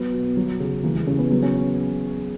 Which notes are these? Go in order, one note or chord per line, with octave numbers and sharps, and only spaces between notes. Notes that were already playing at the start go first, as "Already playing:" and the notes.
Already playing: F#3 B3
B2
F#3
C#3
E3 A#3
G#3
C#3 C#4
B3
F#3 B3
C#4